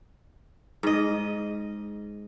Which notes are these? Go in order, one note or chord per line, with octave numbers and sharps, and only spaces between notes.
G#2 D#5